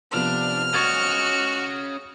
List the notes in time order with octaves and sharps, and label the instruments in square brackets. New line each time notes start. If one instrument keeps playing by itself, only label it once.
[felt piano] C3 F3 B3 [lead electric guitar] D4 [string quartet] F6
[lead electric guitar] C#4 D#5 [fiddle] F#4 [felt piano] C#6 G#6 A6